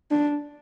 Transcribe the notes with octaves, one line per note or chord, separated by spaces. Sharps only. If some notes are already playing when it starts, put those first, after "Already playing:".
D4